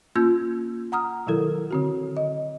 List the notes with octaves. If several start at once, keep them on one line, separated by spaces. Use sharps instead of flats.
A#3 C#4 F4 E6 G6 G#6
F#5 A#5 D#6 F6
B2 D#3 F#3 E4 A4 A#4
D3 C4 F#4
D#5